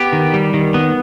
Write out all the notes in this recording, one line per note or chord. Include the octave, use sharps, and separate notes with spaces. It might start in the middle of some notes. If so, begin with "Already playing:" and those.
Already playing: B3 G4
D#3
G3
D#3
B3